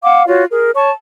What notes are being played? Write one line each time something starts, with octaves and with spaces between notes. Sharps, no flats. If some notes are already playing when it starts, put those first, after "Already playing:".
F5 F#5 D6
F4 F#4 C#5
G#4 A#4
C#5 A5 C#6